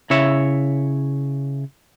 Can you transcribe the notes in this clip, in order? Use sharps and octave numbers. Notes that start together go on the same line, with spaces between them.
C#3 E4 C#5 E5